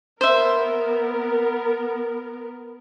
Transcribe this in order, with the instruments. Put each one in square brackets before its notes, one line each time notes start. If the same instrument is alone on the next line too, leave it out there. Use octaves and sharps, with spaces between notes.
[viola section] B3 A#4 [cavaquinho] C5 E5